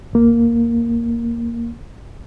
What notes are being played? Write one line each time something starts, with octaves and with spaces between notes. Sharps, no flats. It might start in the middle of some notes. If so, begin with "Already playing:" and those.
D2 A#3